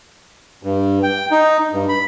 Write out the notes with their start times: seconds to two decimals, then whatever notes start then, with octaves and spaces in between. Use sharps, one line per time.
0.63 G2
1.03 G5
1.31 D#4
1.73 G2
1.89 B5